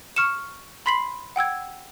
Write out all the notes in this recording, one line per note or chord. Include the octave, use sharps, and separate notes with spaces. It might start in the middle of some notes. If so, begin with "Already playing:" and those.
C#6 F6 C#7 E7
B5 C6 B6 C7 F#7
F#5 G5 E6 G#6